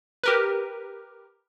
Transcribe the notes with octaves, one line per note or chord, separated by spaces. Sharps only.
G4 A#4 B4